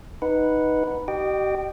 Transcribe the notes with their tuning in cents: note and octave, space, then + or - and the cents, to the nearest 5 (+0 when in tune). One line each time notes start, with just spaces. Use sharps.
D#4 +0 B4 -5 F#5 -5
G4 -35 D#5 -35 G5 +0